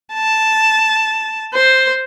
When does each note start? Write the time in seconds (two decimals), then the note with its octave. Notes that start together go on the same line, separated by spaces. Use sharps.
0.13 A5
1.54 C5